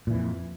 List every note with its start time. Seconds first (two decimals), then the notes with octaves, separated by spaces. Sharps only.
0.07 A#2
0.11 E3
0.14 F2